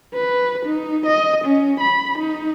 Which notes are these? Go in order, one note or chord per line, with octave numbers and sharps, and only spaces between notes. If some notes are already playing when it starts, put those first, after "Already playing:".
B4
D#4
D#5
C#4
B5
D#4